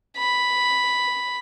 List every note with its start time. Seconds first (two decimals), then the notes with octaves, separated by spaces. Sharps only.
0.17 B5